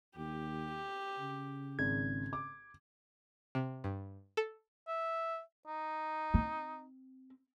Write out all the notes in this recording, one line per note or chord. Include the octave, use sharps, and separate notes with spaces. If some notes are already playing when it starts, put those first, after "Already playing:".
D#2 G4
C#3
G#1 G#6
D6
C3
G2
A4
E5
D#4
C4